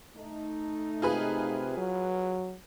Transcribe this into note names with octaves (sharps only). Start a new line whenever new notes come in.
A3 D#4
C3 F4 G#4 B4
F#3